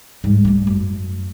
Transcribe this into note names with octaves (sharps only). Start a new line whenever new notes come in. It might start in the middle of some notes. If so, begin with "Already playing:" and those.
G#2 G3
G3 A3
F#2